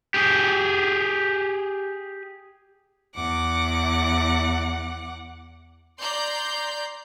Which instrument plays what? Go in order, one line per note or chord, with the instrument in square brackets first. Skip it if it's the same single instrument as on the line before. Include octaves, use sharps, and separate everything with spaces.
[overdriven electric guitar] G4 G#4
[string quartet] E2 F#5 D6
[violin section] D5 A#5 C6 G6